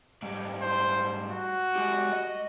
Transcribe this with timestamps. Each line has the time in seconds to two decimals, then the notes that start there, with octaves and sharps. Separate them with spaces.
0.23 G#2 G3
0.62 C5
1.31 F#4
1.76 G#3 G4
2.12 D#5